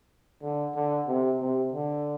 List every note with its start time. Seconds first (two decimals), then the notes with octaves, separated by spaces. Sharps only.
0.42 D3
0.75 D3
1.07 C3
1.40 C3
1.73 D3